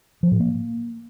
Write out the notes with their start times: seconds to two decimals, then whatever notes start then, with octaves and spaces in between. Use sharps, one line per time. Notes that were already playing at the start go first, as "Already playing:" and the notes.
0.23 F3
0.31 A2
0.40 A#3